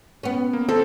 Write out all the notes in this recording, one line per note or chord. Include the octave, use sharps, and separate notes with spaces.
B3 C#4
A#3
C4 A4